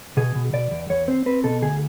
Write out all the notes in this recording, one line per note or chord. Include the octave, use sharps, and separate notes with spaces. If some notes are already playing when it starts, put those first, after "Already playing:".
B2 G#4
B2
B2 D5
E2
E2 C#5
C4 C5
C4 B4
B2 A4
D2 G#4